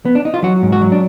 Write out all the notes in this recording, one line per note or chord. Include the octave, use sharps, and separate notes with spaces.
B3
D4
D#4
F4
F#3 F#4
G#2
F#4
F#3
D4